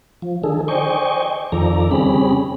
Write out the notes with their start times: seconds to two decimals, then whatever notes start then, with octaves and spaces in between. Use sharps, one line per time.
0.22 F3
0.44 D3 D#3 G#4 A4
0.68 C5 D5 D#5 G5 G#5 C#6
1.52 F2 D#3 F3 A4 D5 A#5
1.91 C#3 G3 C4 C#4 G#4 B5